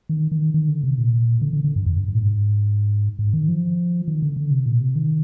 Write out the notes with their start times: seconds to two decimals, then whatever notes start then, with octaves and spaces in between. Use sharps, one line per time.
0.09 D#3
0.32 D#3
0.54 D#3
0.68 D3
0.84 C3
0.98 A#2
1.42 D3
1.53 D3
1.64 D3
1.76 G2
1.86 F2
1.97 G2
2.08 G2
2.15 A#2
2.19 G#2
3.19 G#2
3.33 D#3
3.48 F3
4.08 D#3
4.22 D3
4.36 D3
4.51 C3
4.66 A#2
4.81 C3
4.96 D#3